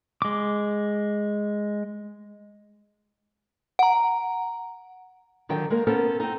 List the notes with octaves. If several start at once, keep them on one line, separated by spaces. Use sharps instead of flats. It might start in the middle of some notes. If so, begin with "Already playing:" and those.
G#3 D6
F#5 A#5
D3 D#3 F#3 G5
G#3 A#3 A#4
B3 C#4 A4 A#4 C5
C4 D#4